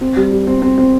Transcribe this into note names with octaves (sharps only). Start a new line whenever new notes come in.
C4
G3
G3
C4
C4
C4